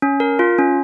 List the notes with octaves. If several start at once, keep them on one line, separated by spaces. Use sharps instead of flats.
C#4
A#4
F4
C#4